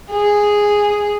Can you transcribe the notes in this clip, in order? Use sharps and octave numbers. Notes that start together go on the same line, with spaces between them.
G#4